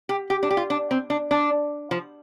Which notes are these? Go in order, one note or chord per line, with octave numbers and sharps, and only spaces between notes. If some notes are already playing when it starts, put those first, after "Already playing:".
G4
G4
D4
G4
F4
D4
C4
D4
D4
F3